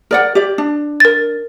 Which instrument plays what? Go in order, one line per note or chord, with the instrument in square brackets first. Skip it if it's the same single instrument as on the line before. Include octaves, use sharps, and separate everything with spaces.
[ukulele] A#4 D5 F#5
G4 D5
D4
[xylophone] A#4 A6